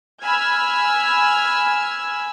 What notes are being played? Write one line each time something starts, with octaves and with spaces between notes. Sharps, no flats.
G#5 B5 E6 F6 G#6